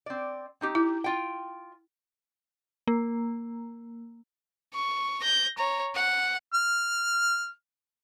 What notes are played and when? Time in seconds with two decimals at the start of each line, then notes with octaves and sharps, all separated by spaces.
0.06 C4 D5
0.61 C4 D#4 G4
0.75 E4
1.04 F4 G5
2.87 A#3
4.74 C#6
5.21 G6 A#6
5.58 C#5 A#5
5.95 F#5
6.54 F6